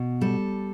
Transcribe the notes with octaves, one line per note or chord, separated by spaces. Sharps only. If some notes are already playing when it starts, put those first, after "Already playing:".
Already playing: B2
G3 A4